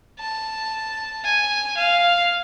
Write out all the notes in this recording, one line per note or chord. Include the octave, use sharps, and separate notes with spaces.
A5
G#5
F5